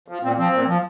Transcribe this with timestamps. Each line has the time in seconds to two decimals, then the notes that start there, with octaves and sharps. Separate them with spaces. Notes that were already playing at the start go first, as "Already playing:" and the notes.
0.08 F3
0.23 A#2 C4
0.38 F3 C4
0.53 A#2
0.68 F3